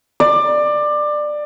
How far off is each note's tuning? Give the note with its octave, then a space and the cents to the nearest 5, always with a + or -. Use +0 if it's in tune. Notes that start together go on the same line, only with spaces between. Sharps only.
D5 +20